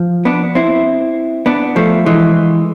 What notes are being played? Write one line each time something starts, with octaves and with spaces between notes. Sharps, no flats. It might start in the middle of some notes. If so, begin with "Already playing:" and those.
Already playing: F3
B3 D4
C4 E4
B3 D4
F3 A3
E3 G#3